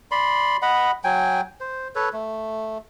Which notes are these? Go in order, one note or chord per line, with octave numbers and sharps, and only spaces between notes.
D5 B5 C6
D#5 F#5 B5
F#3 G5 G#5
C5
A4 B4 C#5
A3